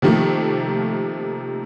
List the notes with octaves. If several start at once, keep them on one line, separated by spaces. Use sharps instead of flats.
C3 D#3 F3 A3 A#3